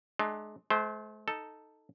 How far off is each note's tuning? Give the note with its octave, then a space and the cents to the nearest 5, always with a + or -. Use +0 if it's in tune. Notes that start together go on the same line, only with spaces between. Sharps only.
G#3 +35 D4 +40
A3 -45 C5 -5
D#4 +0 A4 +0